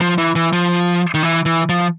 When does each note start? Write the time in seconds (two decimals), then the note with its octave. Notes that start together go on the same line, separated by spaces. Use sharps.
0.01 F3
0.18 E3
0.36 E3
0.53 F3
1.14 D#3
1.23 E3
1.46 E3
1.69 F3